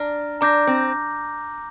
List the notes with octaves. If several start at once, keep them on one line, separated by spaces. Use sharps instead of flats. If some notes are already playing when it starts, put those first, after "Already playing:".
Already playing: D4 A#5 F6 A#6
D4 A#5 D6 G6 A#6
C4